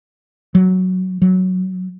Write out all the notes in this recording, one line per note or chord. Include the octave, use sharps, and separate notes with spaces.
F#3
F#3